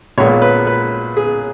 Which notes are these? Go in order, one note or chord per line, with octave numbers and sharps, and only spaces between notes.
A#1 A#2 G#3 B3 C#5
B4
B4
G#4